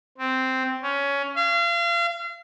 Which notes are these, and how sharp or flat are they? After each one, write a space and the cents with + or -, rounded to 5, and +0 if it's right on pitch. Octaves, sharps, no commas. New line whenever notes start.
C4 -5
C#4 +15
F5 -35